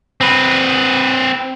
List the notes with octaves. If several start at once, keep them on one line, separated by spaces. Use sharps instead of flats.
C4 B4